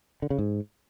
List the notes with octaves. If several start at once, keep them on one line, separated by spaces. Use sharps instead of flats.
D3
C#3
G#2